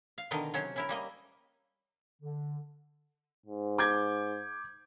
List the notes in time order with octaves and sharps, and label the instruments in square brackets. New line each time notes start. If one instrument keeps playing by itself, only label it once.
[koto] F5
B2 D3 D#3 A#4 D#5
C3 F#3 C#4 C5 C#5
C#4 E4 A#4
G3 A#3 D#5
[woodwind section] D3
[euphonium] G#2
[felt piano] D6 G6 G#6